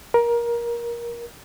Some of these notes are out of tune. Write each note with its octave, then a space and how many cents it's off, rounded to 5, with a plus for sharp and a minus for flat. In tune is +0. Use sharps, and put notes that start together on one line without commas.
A#4 +20